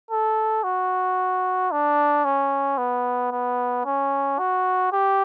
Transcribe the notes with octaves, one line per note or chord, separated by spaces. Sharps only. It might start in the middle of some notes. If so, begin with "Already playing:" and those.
A4
F#4
D4
C#4
B3
B3
C#4
F#4
G4